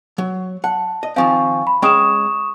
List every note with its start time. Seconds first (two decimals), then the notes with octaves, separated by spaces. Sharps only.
0.18 F#3
0.64 F#5 A5
1.03 D#5
1.16 D#3 F3 C4 F5 G#5 C#6
1.67 B5
1.82 G#3 C#4 G5 C#6 D#6 E7